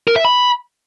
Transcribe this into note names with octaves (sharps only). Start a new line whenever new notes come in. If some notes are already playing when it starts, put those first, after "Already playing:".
A#4
E5
B5